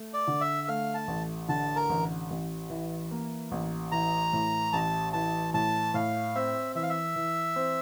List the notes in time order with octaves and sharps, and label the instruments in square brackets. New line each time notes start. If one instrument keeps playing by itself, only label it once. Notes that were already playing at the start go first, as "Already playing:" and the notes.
Already playing: [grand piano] A3
[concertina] D5
[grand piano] D3
[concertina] E5
[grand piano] A3 [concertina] F5
[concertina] A5
[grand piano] A1
[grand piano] D3 [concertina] A5
[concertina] A#4
[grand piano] A1
A1
E3
A#3
A1
[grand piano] E3 [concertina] A#5
[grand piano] A2
[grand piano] A1 [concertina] A5
[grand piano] E3 [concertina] A5
[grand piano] A2 [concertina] A5
[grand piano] A2 [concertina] F5
[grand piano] C4 [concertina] E5
[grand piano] E3 [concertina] E5
[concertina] F5
E5
[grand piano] E3
C4